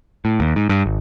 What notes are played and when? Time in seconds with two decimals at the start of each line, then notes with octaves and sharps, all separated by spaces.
0.25 A2
0.40 D#2
0.56 G#2
0.70 G2
0.86 G#1